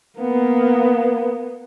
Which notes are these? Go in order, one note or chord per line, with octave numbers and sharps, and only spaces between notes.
A#3 B3